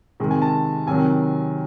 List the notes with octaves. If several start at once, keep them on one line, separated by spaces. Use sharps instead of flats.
C3 D#3 G#3
G#5
A5
C3 D#3 F#3 G#5